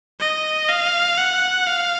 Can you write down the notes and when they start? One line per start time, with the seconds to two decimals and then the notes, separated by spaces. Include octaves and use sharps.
0.20 D#5
0.69 F5
1.17 F#5
1.67 F5